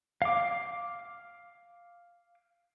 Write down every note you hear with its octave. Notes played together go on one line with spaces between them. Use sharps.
F5 D6